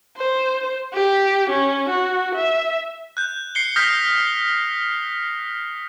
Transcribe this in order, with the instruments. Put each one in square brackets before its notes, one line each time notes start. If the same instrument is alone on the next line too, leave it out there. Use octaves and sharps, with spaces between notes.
[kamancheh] C5
G4
C#4
F#4
E5
[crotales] F#6 G6
C7 C#7 G7
D#6 F6 G6 A#6 B6 G7